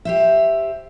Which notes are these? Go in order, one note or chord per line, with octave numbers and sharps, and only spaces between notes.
G4 C5 E5